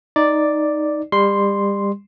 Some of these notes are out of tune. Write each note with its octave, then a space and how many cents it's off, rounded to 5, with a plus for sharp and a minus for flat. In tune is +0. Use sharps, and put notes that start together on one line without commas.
D#4 +0 D5 +0
G3 +30 C6 +0